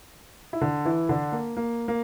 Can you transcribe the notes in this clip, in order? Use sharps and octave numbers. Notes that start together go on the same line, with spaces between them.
E4
D3 D4
E3 E4
D3 D4
A#3
A#3
A#3